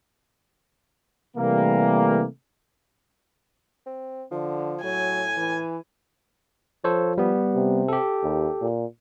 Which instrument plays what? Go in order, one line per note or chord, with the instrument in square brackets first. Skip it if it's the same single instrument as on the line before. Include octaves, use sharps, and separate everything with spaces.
[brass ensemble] C3 E3 G3 A3 A#3
[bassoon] C4
[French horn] D3 [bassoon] F3
[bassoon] A2 [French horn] F#3 [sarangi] G#5
[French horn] E3
[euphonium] F3 [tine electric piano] A4 C5 C#5
[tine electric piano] G3 B3
[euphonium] C3
[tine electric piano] G4 A4
[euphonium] D#2
A#2